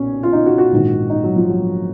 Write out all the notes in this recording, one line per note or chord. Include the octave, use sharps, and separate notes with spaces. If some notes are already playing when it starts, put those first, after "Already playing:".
Already playing: B1 A#2 C#4
F4
D#4
F#4
F#4
A#1 G#2 D#3
D#4
F#3
F3
F#3